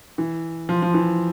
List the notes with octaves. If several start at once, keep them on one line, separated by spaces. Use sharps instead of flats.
E3
F3
F3
E3